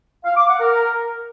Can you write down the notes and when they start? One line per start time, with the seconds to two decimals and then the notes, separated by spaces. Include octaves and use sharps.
0.25 F5
0.36 D6
0.48 F#5
0.60 A#4